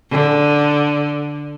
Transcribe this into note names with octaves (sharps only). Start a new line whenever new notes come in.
D3